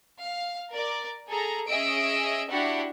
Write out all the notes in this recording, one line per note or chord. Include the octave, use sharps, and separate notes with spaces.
F5
A#4 D5
G#4 A4 A#5
C#4 G#4 D#5 E5 E6 D7
D4 E4 F#4 G4 F#5